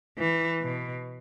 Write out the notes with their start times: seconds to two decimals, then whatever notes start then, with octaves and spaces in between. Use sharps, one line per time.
0.18 E3
0.62 B2